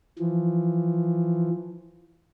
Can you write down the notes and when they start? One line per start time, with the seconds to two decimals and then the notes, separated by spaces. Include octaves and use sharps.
0.19 E3 F3